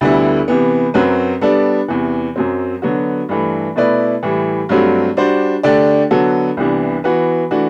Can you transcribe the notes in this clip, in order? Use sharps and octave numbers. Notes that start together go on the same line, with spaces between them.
D2 D3 G3 B3 E4
C3 E3 B3
F#2 F#3 C4 F#4 B4
G3 B3 D4 A4 D5
E2 C3 E3
F#2 F#3 C4
D3 F#3 B3 F#4
G2 E3 A3
B2 A3 E4 B4 D5
A2 E3 G3
G2 F#3 A3 C4 F#4
G3 D4 F#4 C5
D3 A3 D4 G4 D5
D3 F#3 B3 F#4 A4
C2 C3 E3 B3 D4
E3 B3 F#4 B4
E3 A3 D4 F#4